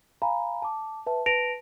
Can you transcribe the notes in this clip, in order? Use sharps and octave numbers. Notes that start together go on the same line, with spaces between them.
F5 G#5 A#5 B5
A5 D6
B4 E5 A5
B4 A5 A#6 D7 F7